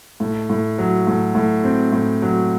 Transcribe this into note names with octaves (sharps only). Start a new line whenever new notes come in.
A2
A2
F#3
A2
A2
C4
A2
F#3